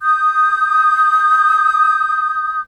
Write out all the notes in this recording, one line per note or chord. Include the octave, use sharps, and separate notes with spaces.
D#6 G6